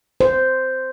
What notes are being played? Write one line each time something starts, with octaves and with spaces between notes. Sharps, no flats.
C5